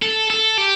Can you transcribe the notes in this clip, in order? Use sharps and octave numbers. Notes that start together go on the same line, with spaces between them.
A4
A4
G4